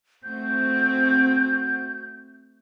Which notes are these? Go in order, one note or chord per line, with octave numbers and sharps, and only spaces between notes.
A3 C4 F#4 G6